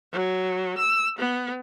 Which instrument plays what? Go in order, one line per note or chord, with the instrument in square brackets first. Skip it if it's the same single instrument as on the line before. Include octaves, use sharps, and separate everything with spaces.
[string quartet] F#3
E6
B3